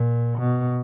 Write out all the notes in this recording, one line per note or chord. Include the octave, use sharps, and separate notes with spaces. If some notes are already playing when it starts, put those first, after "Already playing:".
Already playing: A#2
B2